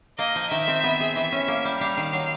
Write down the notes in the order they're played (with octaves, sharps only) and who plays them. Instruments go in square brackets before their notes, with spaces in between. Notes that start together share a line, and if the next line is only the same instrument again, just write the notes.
[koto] A#3 [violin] D#5
[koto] F3
[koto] D#3 [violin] E5
[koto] C4
B3
G#4
[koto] E3 [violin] E5
[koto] C#4
A#3
G3
[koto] G3 [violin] F5
[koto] D#3
F#3